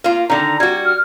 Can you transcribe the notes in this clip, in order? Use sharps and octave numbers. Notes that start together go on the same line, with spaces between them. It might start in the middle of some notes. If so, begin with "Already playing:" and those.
A#3 F4
D3 D#3 A#5
G3 F#4 G#6
F6